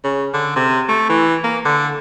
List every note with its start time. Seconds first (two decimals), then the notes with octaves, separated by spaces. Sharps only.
0.04 C#3
0.34 D3
0.56 C3
0.89 A3
1.10 E3
1.44 A#3
1.65 D3